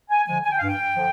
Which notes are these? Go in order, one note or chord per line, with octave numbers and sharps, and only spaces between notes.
G#5
D3 F3 G#3 G#5
G#5
G5
G2 F5
G5
D3 F3